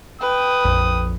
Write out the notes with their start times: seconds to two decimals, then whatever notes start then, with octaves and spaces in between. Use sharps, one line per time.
0.21 B4 G5 D#6
0.64 A#1 F2